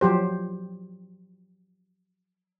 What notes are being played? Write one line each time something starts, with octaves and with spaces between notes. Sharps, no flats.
F3 F#3 G4 C5